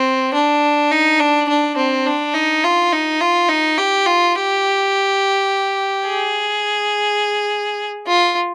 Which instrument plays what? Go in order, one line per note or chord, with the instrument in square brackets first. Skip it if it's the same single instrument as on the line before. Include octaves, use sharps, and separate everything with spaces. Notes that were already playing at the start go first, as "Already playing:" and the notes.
Already playing: [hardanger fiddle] C4
D4
D#4
D4
D4
C4
D4
D#4
F4
D#4
F4
D#4
G4
F4
G4
G#4
F4